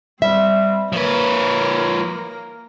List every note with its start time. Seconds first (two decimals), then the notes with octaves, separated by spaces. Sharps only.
0.22 G3 C4 E5
0.92 F3 A#3 A#4 B4 C#5